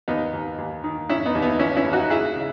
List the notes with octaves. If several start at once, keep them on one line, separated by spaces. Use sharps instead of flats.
D#2 B3 D#4
D#2
D#2
D#3
D#3 C#4 E4
B3 D#4
D#2
B3 D#4
D#2 C#4 E4
C#4 E4
D#2
D#4 F#4
C#3 E4 G#4
C#3